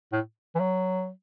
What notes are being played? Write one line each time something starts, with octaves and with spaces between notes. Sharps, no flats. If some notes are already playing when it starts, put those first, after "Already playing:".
A2
E3
F#3